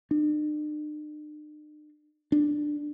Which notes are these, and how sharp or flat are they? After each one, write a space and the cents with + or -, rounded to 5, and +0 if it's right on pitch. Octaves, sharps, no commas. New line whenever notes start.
D4 +45
D4 +15